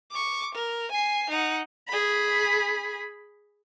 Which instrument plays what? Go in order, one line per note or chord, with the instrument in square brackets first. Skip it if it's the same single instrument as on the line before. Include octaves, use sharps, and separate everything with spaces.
[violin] C#6 D6
A#4
G#5 C7
D#4 F#5
G#4 B5